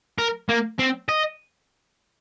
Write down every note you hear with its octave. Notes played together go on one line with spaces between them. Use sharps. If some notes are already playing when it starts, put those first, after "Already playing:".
A#4
A#3
C4
D#5